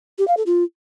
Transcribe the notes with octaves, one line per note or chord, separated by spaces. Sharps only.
G4
F5
A4
F4